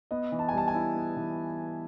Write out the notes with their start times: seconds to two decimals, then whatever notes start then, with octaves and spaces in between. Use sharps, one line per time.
0.11 B3 D#5
0.32 E3
0.39 A5
0.49 G#5
0.53 G3 A5
0.68 G#5
0.74 E4
0.96 B3
1.17 E3